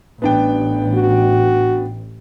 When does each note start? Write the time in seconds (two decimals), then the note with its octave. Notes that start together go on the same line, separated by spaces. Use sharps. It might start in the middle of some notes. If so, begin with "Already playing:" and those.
0.22 A1 B3 D4 G5
0.94 F#4